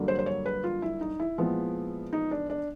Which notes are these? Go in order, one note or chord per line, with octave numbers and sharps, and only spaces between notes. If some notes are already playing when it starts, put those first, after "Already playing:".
Already playing: G2 D3 F#3 A#3
C5
C5
C#5
B4
F4
E4
D#4
E4
A#2 F3 G#3 B3
D#4
D4
D4